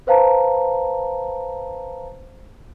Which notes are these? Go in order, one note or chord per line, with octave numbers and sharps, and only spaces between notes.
B4 C5 F5 A5 A#5